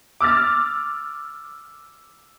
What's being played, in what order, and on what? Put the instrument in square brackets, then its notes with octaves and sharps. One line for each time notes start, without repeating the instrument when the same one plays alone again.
[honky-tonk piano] D6 E6 F6 A6